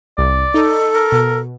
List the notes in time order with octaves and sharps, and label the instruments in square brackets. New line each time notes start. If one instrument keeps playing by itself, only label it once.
[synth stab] C2 [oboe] D5
[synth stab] D#4 [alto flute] A4
[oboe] A#4
[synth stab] B2